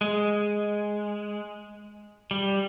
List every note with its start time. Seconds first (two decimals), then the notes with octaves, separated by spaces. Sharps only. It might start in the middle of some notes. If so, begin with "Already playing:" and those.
0.01 G#3
2.31 G3